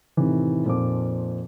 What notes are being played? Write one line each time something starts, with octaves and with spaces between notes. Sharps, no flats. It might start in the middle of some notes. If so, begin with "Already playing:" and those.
A2 C3 D#3 E3
F2 A#2 F3 C4 D#4 D6